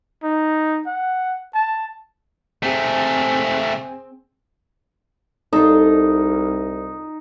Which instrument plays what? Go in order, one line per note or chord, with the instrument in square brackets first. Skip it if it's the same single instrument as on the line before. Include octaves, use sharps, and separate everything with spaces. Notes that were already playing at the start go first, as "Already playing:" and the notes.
[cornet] D#4
F#5
A5
[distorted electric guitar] C3 A3 [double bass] C4 [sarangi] G#4
[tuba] C2 [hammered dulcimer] D#4 [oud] F4 A4